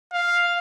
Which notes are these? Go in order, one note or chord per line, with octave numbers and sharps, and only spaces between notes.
F5